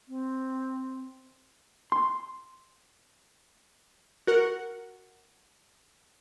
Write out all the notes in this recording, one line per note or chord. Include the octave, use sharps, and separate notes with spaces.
C4
C6
F#4 A#4 F#5